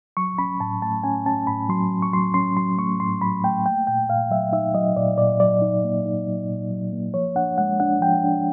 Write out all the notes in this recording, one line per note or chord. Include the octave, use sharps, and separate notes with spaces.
F#3 C#6
C#4 B5
A2 A5
A3 A5
C#4 G#5
C#4 A5
A2 B5
F#3 C6
F#3
C#6
F#3 C6
C#4 C6
F#3 C6
A3 C#6
A2 C6
F#3 B5
A3 G5
A#3 G5
A#2 G5
A#2 F5
F#3 E5
D#4 E5
F#3 D#5
A#2 D5
A#2 D5
F#3 D5
D#4
A#3
D#4
F#3
A#2
F#3
A#3
F3 C#5
D4 F#5
G#3 F#5
D4 F#5
F3 G5
D4